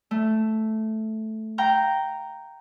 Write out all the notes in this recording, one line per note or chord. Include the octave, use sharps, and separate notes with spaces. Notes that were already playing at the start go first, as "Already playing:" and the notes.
A3
F5 G5 A#5